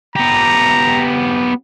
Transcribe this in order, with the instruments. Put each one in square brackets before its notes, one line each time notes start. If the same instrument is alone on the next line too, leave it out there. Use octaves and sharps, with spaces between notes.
[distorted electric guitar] B3 G4 [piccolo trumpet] A#5